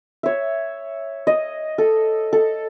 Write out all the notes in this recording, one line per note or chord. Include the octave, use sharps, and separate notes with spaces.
C#5 E5
D#5
A4
A4